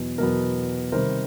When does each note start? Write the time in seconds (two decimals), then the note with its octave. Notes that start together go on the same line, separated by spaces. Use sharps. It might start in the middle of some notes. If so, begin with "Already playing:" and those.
Already playing: E2 B2 F#3 B3
0.18 E2 B2 F#3 B3 A#4
0.92 C3 D#3 G3 A#4 C5